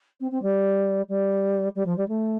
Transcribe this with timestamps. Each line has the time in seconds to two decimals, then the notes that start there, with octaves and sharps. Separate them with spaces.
0.20 C4
0.31 C4
0.42 G3
1.08 G3
1.75 G3
1.85 F3
1.97 G3
2.08 A3